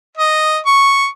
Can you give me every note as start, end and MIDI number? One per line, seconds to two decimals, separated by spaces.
0.18 0.58 75
0.66 1.07 85